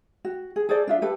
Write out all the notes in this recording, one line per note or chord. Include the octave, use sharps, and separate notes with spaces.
F#4
G#4
G#4 A4 C5 D5
D4 F4 E5
G4 A4 B4